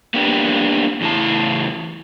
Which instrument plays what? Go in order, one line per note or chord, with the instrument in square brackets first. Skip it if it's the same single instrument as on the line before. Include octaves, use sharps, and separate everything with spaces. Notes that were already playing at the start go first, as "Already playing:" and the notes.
[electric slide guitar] A#3 B3 D4 G4
E2 A2 C#3 E4 A5